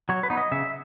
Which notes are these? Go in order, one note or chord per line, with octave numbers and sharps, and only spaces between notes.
F#3 C#5
B4
B3 D#4
D#5
C#3 E5